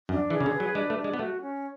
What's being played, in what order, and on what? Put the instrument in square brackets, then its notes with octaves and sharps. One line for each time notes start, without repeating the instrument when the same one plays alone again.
[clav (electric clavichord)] F#2 [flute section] D4
[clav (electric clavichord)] E3 [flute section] G#4
[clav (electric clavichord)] C#3
D3
[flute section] B4
[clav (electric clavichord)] F#3
[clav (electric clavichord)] G#3 [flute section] D4
[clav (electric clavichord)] A3
[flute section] D4
[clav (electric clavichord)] G#3
B3
[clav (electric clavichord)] A3 [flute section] F#4
[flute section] C#4